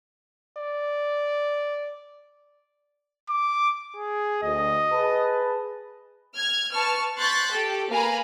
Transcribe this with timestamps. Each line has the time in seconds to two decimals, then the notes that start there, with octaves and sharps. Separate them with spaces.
0.57 D5
3.30 D6
3.97 G#4
4.43 D2 D#5
4.92 G#4 B4 A5
6.35 F6 G#6
6.74 B4 A5 C#6 F6
7.15 C6 C#6 F#6 G6 A6 B6
7.53 G4 A4
7.90 A#3 B4 F5 G#5 A#5 B5